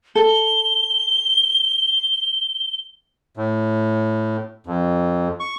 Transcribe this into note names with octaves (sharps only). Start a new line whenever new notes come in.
A4 G7
A2
F2
C#6